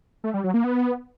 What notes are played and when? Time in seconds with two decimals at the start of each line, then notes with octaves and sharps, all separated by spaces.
0.24 A3
0.34 G3
0.44 F#3
0.54 A#3
0.64 B3